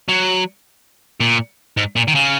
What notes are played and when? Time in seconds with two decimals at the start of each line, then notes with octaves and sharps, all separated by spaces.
0.09 F#3
1.20 A#2
1.77 G#2
1.96 A#2
2.08 D#3
2.15 C#3